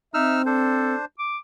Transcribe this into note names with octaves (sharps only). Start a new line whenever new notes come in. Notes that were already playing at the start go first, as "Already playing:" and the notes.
C4 D#4 E5 E6 F6
D4 A4 C5
D6